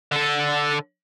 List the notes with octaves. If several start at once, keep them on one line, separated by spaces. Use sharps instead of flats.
D3 A4